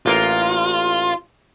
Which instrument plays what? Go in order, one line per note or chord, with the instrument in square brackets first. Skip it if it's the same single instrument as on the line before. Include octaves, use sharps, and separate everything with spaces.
[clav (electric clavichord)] A1 A#3 A#4 [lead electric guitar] F4